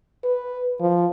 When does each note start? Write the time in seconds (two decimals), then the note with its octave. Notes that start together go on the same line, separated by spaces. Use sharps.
0.24 B4
0.80 F3